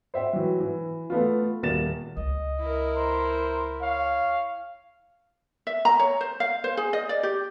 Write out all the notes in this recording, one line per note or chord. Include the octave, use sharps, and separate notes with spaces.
C5 E5 G5
E3 F#3
E3
A3 B3 F4
D#1 A#3 A6 E7
C#2 D#5
E4 A#4
C5 A#5
C#5 F5
E5
A#5
C#5
C5
F5
C5
G#4
D#5
D5
G4